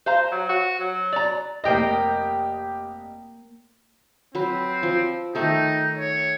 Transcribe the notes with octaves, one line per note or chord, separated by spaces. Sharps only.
C5 F5 A#5
F#3
F#4
F#3
D5 A#5
F1 A#3 G4 D#5 G5 A#6
F#3 C4 B4
F3
D#3 A3 D#4 A4
C#5